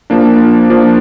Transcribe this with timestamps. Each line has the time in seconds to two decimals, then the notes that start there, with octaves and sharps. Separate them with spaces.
0.10 F3 A#3 D4
0.70 F3 A#3 D4